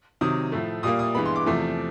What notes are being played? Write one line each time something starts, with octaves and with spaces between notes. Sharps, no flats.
C3 D#3 F#3 D#6
A2 F3 A3
A#2 G3 A#3 D#6
D#6
G2 E3 G#3 B3 B5
C6
D6
E2 C3 F3 A3